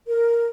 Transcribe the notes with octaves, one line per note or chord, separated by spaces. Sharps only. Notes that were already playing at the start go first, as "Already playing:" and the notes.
A#4